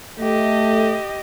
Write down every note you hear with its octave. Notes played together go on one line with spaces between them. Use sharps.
A3 G4 D#5